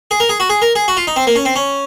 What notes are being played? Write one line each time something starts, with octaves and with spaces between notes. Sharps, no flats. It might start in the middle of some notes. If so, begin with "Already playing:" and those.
G#4
A#4
G#4
F#4
G#4
A#4
G#4
F#4
F4
D#4
C4
A#3
C#4
C4
C#4